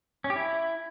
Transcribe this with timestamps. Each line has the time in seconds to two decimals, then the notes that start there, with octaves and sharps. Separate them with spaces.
0.24 C#4
0.30 G4
0.36 E4